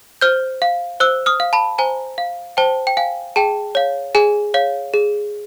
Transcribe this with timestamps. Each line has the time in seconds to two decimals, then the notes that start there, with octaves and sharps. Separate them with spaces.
0.21 C5 F6 G6
0.62 F5
1.00 C5 E6 F#6
1.26 D#6 F6
1.40 F5
1.53 A5 B5
1.78 C5 G#5 A#5
2.18 F5
2.57 C5 G5 A5
2.87 G5
2.97 F5 G#5
3.36 G#4 G5 A5
3.75 C#5 F5
4.15 G#4 G#5
4.54 C#5 F5
4.94 G#4